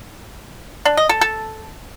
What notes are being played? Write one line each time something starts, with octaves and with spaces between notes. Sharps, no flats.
D4
D#5
A4
A4